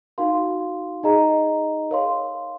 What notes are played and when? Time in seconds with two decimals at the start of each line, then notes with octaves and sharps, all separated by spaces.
0.18 D#4 F#4 A#4 F5 C6
1.03 D#4 G#4 D#5 A#5
1.91 A#4 C#5 F5 C6